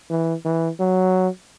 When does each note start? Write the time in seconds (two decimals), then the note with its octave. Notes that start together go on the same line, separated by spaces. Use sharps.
0.10 E3
0.45 E3
0.80 F#3